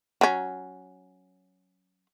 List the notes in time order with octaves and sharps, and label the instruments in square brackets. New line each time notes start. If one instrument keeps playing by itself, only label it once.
[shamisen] F#3 C#4